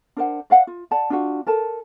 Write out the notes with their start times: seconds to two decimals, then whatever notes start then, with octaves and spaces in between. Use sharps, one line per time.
0.17 D4 A#4 C5 F#5
0.50 D5 F5 F#5
0.67 F4
0.91 D5 F#5 A5
1.10 D4 F4 F#4
1.47 A4 A#4 A5